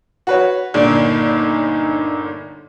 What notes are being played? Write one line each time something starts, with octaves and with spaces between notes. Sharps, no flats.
F#4 B4 C#5
G1 A#2 D3 D#4 D5